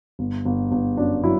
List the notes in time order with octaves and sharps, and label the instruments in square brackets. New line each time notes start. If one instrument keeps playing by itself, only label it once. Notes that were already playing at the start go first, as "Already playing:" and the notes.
[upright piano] G1
G1
G1
F#2 D4
F#3 E4